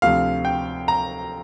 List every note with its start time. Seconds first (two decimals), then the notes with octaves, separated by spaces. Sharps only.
0.02 D2 C3 F3 F5
0.45 G5
0.88 A#5